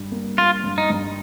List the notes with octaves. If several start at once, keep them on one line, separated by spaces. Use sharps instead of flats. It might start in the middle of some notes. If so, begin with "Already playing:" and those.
Already playing: G2
A#3
A#3 F4
G2
D#4
G2